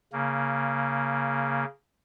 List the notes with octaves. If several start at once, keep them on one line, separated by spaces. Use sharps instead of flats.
C#3 A#3